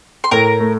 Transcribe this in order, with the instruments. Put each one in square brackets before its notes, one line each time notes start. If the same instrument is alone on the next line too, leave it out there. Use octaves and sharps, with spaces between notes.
[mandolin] C6
[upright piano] A2 [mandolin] A#4 A#5
[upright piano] A3